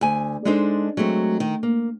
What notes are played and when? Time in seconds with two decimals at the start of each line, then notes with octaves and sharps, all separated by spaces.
0.01 D2 G#5
0.45 G#3 D4 D#4 A4 C5
0.97 F#3 G#3 A3 C4
1.40 D#3
1.63 A#3